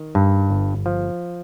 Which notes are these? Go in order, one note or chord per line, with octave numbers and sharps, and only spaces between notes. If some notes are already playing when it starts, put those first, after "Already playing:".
Already playing: D#3
G2
G1
F3